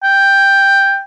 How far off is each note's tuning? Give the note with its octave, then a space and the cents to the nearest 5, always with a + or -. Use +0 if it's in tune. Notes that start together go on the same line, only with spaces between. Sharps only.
G5 +5